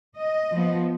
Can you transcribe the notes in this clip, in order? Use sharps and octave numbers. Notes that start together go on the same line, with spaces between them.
D#5
F3 B3